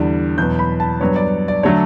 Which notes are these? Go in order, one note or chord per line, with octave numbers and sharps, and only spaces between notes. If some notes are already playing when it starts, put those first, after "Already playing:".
Already playing: E2 D3 G3
E2 B2 F#3 B3 G6
B5
A5
G2 F#3 B3 D4 C#5
D5
D5
D3 F#3 A3 D4 C#5